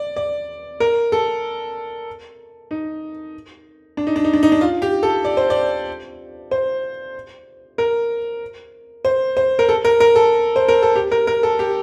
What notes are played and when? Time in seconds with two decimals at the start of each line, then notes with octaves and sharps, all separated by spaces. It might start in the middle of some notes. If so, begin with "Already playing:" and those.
Already playing: D5
0.16 D5
0.80 A#4
1.12 A4
2.71 D#4
3.97 D4
4.07 D#4
4.16 D4
4.24 D#4
4.33 D4
4.43 D#4
4.52 D4
4.61 F4
4.82 G4
5.03 A4
5.25 D5
5.37 C5
5.50 D5
6.51 C5
7.78 A#4
9.05 C5
9.37 C5
9.59 A#4
9.69 A4
9.85 A#4
10.00 A#4
10.16 A4
10.56 C5
10.68 A#4
10.82 A4
10.95 G4
11.12 A#4
11.27 A#4
11.43 A4
11.59 G4